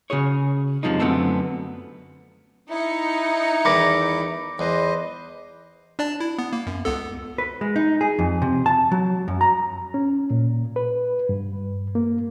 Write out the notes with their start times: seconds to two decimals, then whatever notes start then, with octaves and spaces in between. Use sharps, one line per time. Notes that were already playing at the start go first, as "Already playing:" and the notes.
0.10 C#3 F#4 G#4 C#5
0.83 F#2 C3 F3 G#3 D#4
1.00 F#2 D3 A3 B3 C4 A5
2.70 D#4 E4 C#7
3.65 E2 D#3 B5 D6 A#6
4.59 E2 B4 C5 D#5
5.99 D4 D5 A5
6.20 E4
6.38 B3
6.53 A#3
6.67 F#2
6.85 C#2 B3 A4
7.38 B4
7.61 G#3
7.76 D#4
8.01 G#4
8.19 F2
8.42 C3
8.66 A5
8.92 F#3
9.28 F#2
9.41 A#5
9.94 C#4
10.31 A#2
10.76 B4
11.29 G2
11.95 A#3